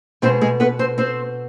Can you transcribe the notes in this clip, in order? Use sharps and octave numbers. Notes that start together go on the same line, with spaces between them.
B2 G#3 C4 C5
G#3 G#4
B3 B4
C4 C5
C4 C5